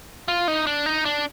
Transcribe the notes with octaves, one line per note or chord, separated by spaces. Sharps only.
F4
D#4
D4
D#4
D4